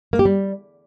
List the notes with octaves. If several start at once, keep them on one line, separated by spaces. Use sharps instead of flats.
A#3
G4
G3